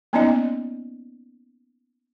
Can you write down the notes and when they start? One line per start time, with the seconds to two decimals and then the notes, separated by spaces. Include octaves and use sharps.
0.13 A#3 B3 C#4 D#4 D5 D#5